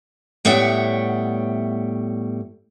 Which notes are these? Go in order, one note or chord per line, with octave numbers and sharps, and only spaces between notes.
A2 G3 B3 C#5 E5 F#5